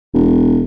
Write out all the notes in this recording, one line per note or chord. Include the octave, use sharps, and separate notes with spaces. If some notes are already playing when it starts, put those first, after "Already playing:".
E1